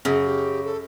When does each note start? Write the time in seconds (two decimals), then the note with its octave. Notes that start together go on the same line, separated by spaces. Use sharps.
0.05 F#2 C#3 G#4
0.25 G4
0.64 A4